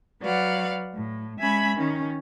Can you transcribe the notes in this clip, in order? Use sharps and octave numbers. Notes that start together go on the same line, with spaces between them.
F#3 B4 D5 F5 F#5
A2
G#3 C#4 E5 G#5 B5 G#6
D#3 C#4